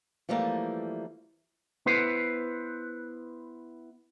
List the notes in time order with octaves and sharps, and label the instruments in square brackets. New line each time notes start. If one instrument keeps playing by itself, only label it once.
[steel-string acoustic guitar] E3 F3 G3 A3 A#3
[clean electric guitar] B3 E4 B4 C5